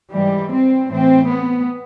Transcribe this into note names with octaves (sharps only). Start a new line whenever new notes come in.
G#2 E3 G3
C4
A2 E3 C4
B3